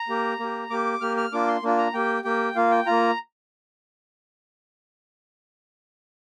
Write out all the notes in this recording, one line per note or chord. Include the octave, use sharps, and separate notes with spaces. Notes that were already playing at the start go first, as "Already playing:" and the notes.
Already playing: A#5
A#3 G4
A#3 G4
A#3 G4 D6
A#3 G4 F6
F6
A#3 D4 F4 D6
C6
A#3 D4 F4
A#5
A#3 G4 G5
A#3 G4 G5
A#3 F4 F5
G5
A#3 F4 A#5